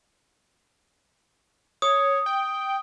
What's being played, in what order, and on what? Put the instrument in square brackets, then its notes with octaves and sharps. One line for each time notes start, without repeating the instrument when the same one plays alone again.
[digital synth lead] C#5 [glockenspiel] D#6
[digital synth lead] G5